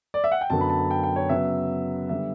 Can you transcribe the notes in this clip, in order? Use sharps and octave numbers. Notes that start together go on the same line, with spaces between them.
D5
E5
F#5
G5
F#2 D3 F#3 B3 A5
B5
A5
G5
G5
C#5
C#3 F#3 B3 E5
D3 G3 B3 E5